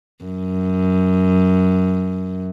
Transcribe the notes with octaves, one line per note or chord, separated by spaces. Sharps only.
F#2